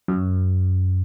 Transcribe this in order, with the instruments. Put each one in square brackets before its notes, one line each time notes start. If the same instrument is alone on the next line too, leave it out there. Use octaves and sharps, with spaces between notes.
[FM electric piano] F#2